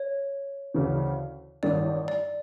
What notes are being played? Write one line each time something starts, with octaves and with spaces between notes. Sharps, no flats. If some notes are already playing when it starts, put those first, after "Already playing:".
Already playing: C#5
D2 C#3 E3
A1 G2 D#3 D5
D5